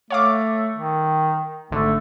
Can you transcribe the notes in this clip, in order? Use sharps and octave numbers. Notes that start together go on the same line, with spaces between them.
A3 C#5 F5 D6
D#3
G#1 D3 A3